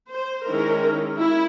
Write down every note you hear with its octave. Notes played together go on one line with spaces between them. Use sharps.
C5
D#3 G#3 C#4 E4 A#4
E4